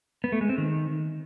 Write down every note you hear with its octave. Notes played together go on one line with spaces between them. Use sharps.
B3
A3
G#3
C4
D#3